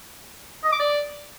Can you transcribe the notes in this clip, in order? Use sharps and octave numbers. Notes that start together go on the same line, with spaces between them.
D#5
D6
D5